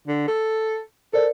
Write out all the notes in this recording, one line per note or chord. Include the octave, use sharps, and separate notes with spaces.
D3
A4
A4 A#4 C5 D5